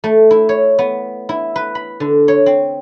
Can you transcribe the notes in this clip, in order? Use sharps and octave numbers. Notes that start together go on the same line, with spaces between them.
A3
E4
C#5
B3
E4
B4
B5
D3
C#5
C4